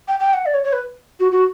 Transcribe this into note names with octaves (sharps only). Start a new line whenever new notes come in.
G5
G5
F#5
D5
C#5
C#5
B4
F#4
F#4